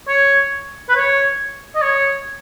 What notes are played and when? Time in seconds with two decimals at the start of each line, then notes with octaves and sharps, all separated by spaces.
0.08 C#5
0.89 B4
0.95 C#5
1.76 D#5
1.82 C#5